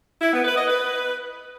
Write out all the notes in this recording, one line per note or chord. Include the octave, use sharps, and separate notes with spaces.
E4
B3
B4
D#5
B4